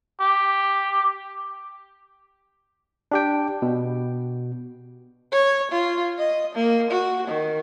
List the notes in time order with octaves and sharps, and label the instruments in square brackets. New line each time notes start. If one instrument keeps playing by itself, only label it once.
[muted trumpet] G4
[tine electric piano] D4 G4 G5
B2
[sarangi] C#5
F4
D#5
A#3
F#4
D#3